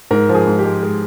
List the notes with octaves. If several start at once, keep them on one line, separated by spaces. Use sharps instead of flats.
G#2 A#4
F3
G#4
G#2
G4
G#3
G#3